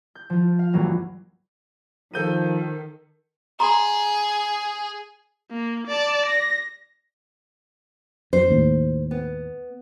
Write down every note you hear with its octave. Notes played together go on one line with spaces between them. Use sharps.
G6
F3 F4
F5
D2 G2 E3 F#3 A#3
D#3 F3 A4 A#4 G6 D#7
G#4 A#5 C6
A#3
D5 A5
A#6
F#2 C5
D#2 A2
B3